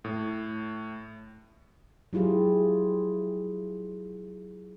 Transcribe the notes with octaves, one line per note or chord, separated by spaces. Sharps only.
A2
F#3 E4 F4 G4 G#4